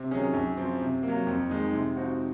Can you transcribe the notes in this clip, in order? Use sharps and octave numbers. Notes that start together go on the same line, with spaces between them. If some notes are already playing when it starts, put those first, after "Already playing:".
Already playing: C3
D#3 F#3 C#4 G#4
F#2
F3 C4
C3
F#3 A#3
F2
D#3 G#3 D#4
C3
F3 C4 D#4 F#4